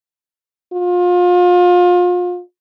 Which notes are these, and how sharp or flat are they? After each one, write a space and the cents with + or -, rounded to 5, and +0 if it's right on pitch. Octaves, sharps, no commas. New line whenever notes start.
F4 +30